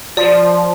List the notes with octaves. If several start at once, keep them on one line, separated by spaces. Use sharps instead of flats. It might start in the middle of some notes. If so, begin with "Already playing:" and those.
F3 D5